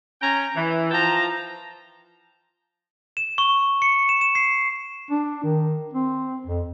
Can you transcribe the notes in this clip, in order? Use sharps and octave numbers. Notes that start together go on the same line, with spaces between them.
C#4 C#5 G5 A#5
E3
F3 G5 A5 A#5
E7
C#6
C#7
E7
E7
C7
D4
D#3
C4
F2